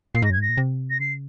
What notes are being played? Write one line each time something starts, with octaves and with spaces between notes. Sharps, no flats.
A#2 C7
G#2 A#6
F#2 G#6
G#2 A#6
A#2
C3
A#6
C#3 C7